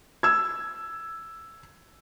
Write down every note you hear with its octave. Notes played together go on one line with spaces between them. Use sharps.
E6 G#6